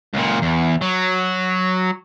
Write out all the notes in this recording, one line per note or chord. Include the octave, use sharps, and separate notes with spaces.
C#2 A#2
E2
F#3